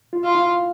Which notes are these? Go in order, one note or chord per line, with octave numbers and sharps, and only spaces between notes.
F4
F4
E4